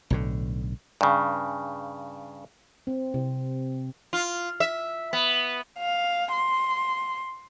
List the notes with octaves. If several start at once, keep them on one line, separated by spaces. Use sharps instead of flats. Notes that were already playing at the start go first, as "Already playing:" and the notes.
B1 A2 D3
G2 C#3
C4
C3
F4
E5
B3
F5
C6